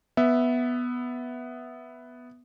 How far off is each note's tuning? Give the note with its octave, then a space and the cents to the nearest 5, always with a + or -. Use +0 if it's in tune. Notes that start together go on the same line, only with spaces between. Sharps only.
B3 +0 E5 +0